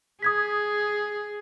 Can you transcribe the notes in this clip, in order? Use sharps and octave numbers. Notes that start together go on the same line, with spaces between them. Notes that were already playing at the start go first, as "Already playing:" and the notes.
G#4 D#6 G#6 B6